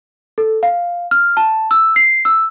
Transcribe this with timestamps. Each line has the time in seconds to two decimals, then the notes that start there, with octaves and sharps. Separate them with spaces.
0.38 A4
0.63 F5
1.11 F6
1.37 A5
1.71 E6
1.96 C7
2.25 E6